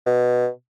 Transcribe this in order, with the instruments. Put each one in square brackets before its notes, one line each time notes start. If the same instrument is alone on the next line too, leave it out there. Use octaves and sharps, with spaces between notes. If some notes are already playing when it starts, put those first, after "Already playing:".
[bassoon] B2